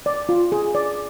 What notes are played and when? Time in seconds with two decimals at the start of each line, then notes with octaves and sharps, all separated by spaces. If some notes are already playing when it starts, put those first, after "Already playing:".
0.06 D5
0.29 F4
0.52 G#4
0.75 D5